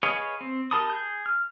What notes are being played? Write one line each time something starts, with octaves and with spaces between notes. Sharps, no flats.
G#4 B4 C#5 D#5 F5
C4
G4 A#4 A5 B5 D#6
G#4 G6
F6